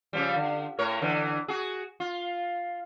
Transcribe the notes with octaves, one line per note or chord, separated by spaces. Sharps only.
C#3 F3 G3
D3
A2 A#4 C#5
D3 E3
F#4 G#4
F4